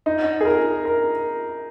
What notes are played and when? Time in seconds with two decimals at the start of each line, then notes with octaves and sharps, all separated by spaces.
0.06 D#4
0.41 G#4
0.45 A#4
0.85 A#4